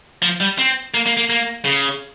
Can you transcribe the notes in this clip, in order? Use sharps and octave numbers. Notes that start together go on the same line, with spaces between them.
F3
G3
C4
A#3
A#3
A#3
A#3
C#3